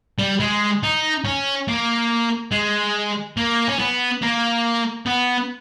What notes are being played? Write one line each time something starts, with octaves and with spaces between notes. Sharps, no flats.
G3
G#3
D#4
C#4
A#3
G#3
A#3
C#4
B3
A#3
B3